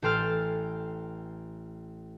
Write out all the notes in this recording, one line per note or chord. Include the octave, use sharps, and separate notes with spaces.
A1 A4 G5 C6 F6 A6